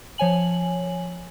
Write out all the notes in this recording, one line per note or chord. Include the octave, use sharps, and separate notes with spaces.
F3 C#5 G#5 F#7